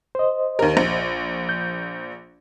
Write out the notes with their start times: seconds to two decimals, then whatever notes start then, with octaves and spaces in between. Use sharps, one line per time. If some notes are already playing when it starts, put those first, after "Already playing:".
0.15 C5 D#5
0.59 D#2 A#4
0.77 A#1
1.49 G6